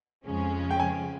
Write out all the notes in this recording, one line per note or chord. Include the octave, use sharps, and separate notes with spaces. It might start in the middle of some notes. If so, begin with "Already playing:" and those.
F2 C#3 F3 G#3 C#4
G5
G#5